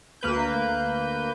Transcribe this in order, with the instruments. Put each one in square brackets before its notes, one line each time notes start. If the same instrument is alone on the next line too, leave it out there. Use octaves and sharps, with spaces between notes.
[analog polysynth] D2 A#3 B4 G6